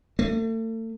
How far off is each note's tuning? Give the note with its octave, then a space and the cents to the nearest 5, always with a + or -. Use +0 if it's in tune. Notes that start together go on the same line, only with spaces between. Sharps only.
A3 +35